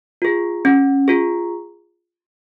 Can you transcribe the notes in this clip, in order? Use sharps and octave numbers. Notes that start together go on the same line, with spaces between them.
F4 G#4
C#4
F4 G#4